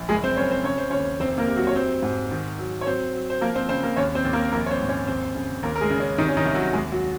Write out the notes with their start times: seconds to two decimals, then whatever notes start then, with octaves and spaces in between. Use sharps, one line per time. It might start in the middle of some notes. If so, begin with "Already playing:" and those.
Already playing: A#1
0.09 F#1 G#3 G#4
0.24 C4 C5
0.37 F#1 C#4 C#5
0.51 C4 C5
0.64 C#3 C#5
0.78 C5
0.90 D#2 C#4 C#5
1.20 F1 C4 C5
1.38 A#3 A#4
1.47 C3
1.57 F#3 F#4
1.67 C#5
1.76 F#3 C4 C5
2.02 G#2
2.31 D#3
2.59 F#3
2.81 C#5
2.86 F#3 C4 C5
3.14 F#3
3.30 C5
3.41 F3 A#3 A#4
3.55 C4 C5
3.69 C#3 C4 C5
3.83 A#3 A#4
3.96 D#2 C#4 C#5
4.15 C4 C5
4.25 D#2
4.33 A#3 A#4
4.52 A#1 A#3 A#4
4.66 C#5
4.71 C4 C5
4.80 G#2
4.89 C#4 C#5
5.07 D#2 C4 C5
5.35 C#3
5.63 D#2 A#3 A#4
5.76 A#4
5.81 G#3 G#4
5.91 C#3
6.00 C#4
6.18 C3 D#3 D#4
6.28 C#4
6.37 D#3 D#4
6.45 C2
6.55 F#3 F#4
6.73 D#2 G#3 G#4
6.92 F#3 F#4